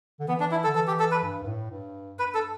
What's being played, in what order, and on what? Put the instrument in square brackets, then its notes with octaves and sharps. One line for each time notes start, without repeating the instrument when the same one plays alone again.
[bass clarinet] D3
[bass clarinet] E3 [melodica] B3
[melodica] D4
E4
A4
[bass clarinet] D3
[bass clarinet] E3 [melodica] A4
[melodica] G4
A4
B4
[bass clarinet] G2
G2
A2
G2
[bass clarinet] G2 [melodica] B4
[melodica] A4